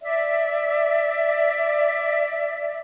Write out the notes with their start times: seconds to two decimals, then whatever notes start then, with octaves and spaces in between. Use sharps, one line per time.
0.02 D5 E5